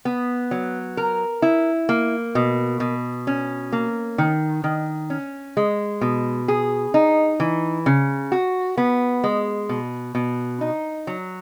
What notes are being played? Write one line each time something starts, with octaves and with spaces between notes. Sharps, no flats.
B3
F#3
A#4
E4
A#3
B2
B2
C#4
A#3
D#3
D#3
C#4
G#3
B2
G#4
D#4
E3
C#3
F#4
B3
G#3
B2
B2
D#4
F#3